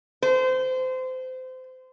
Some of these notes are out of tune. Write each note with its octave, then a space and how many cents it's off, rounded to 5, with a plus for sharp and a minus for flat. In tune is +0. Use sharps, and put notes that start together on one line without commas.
C5 -25